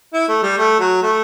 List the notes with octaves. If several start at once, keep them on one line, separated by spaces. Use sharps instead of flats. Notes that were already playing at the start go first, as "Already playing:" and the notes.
E4
A3
G3
A3
F#3
A3